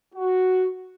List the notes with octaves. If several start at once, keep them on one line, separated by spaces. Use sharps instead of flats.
F#4